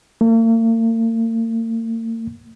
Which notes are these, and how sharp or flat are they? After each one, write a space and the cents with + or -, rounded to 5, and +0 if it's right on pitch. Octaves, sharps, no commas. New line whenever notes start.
A#3 -45